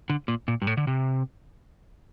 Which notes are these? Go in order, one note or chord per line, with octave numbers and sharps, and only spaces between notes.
D3
A#2
A#2
G2
A2
D3
C3